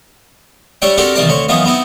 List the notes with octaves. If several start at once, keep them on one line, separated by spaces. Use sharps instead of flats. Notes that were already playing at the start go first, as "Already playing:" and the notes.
G3 D4 C#5 E5 G5
C4 D4 F#4 G4 A4 A#4
C2 D#3 E3 G3 D5 A5
D2 C4 C#5
F#2 E3 F3 B3 D#4 D#6
B3 C4 D#4 E4